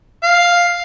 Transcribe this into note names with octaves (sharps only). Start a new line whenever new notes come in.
F5